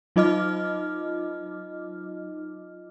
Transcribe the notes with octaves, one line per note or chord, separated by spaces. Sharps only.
F#3 D#4 F4 D#5 D6 F6